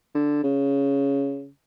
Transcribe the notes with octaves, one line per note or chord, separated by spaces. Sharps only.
D3
C#3